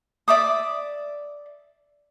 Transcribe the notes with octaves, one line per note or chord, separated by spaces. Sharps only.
D5 E5 D6 D#6